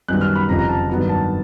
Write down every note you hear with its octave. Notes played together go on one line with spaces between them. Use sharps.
F#2 D#3 G3 B3 F#6
F6
B5
F1 F2 C#3 F3 A#5
A#5
A5
G2 D#3 F#3 B3
A5